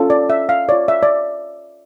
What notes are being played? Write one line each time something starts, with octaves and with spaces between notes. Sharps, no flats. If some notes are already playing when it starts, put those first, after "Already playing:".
Already playing: C#4 F4 A4
D5
E5
F5
F4 C#5 D5
E5
D5